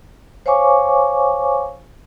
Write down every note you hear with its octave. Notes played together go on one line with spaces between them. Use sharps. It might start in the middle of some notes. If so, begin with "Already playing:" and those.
C5 C#5 F5 G#5 C#6 D6